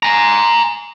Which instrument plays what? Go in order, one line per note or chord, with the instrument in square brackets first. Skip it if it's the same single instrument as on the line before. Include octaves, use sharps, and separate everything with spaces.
[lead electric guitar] G#5 A#5